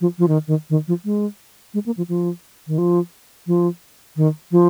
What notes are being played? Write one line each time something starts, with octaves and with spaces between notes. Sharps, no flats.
F3
F3
D#3
D#3
D#3
F3
G#3
G#3
A#3
F3
F3
D#3
F3
F3
D#3
F3